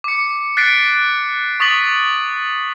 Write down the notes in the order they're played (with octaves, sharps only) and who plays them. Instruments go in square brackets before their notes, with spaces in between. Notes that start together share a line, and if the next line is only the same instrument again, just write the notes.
[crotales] D6 C#7
F#6 A6 B6 C7 D7
C#6 D#6 A6 B6 F#7